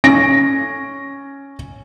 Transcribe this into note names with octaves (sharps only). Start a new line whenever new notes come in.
C#4 A#6 D7